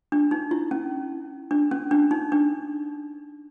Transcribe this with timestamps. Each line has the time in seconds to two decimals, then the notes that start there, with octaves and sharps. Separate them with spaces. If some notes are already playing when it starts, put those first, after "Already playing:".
0.12 D4
0.31 D#4
0.51 E4
0.71 C#4
1.51 D4
1.71 C#4
1.91 D4
2.11 D#4
2.32 D4